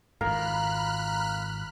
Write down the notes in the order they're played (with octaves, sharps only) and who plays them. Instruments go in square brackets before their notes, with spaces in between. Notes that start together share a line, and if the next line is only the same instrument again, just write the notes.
[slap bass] G#1 F2 [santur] A#4 [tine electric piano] F5 [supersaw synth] B5 F6 F#6